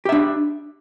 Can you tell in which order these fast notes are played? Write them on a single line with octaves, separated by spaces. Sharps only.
G4 E5 D4